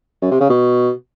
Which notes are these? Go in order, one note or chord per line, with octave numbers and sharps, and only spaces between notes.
F#2
C3
C#3
B2